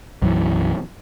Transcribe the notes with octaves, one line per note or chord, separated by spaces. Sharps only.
B1 F#2 E3